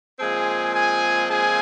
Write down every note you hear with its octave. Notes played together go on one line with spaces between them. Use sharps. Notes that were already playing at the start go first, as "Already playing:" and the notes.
A#2 F3 G#3 C4 G#4 G#5
G#4 G#5
G#4 G#5